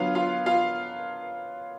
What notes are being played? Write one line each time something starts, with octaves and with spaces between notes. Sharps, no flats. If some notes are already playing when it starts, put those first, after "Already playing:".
Already playing: D3 F#3 B3 F4 F5
F4 F5
F4 F5